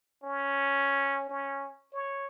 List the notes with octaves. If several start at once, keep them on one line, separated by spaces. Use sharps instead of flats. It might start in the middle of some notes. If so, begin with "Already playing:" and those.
C#4
C#4
C#5